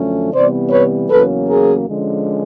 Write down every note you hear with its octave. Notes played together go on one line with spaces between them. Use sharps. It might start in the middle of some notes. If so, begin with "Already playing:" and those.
Already playing: F#2 D3 F3 A3 C#4
C3 E3 G3 B3 C5 D5
B4 C#5
E2 C#3 F#3 A#3 C#4 A4 B4
G#4 A#4
D3 F3 G#3 C#4